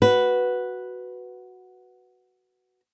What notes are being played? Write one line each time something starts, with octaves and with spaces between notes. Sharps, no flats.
F#4 B4